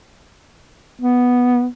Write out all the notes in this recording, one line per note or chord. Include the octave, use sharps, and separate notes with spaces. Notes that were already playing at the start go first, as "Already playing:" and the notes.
B3